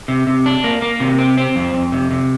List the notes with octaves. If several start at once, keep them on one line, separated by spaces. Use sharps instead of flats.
C3
C3
D4
A#3
A#3
C3
C4
C4
F2
F2
C3
C3